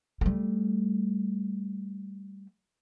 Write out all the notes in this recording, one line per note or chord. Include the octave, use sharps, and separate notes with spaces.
G3 A3